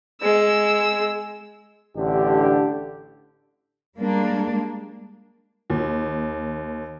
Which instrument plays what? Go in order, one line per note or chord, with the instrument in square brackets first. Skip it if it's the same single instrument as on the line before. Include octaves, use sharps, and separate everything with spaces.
[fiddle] G#3 E6
[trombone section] A1 D3 D4 G4
[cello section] G3 G#3 A#3 D4
[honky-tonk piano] D#2